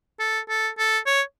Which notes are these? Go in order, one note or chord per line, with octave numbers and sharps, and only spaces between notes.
A4
A4
A4
C#5